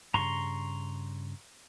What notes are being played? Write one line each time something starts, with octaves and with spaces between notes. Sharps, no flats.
G2 C#3 A#5 C6 C#6